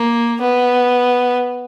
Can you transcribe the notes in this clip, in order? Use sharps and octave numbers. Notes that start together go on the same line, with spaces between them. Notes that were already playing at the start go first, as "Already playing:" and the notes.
Already playing: A#3
B3